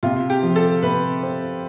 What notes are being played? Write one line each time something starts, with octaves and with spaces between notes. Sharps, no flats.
C3 F4
G4
F3
A4
C3 B4
C4